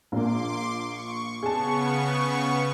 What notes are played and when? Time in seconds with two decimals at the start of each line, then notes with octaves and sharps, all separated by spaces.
0.12 A#1 A#3 C6 D6
0.85 C#6
1.43 C#3 B3 G#4 A5 C#6